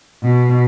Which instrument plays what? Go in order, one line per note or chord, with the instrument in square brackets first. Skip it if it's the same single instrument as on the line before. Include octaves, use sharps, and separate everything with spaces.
[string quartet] B2